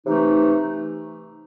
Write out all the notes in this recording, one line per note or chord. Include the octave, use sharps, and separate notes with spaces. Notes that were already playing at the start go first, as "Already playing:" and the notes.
C3 E3 A3 D#4